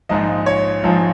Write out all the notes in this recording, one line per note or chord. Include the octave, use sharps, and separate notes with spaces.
A#1 G#2 F3 D#5
C#5
A#1 G#2 F3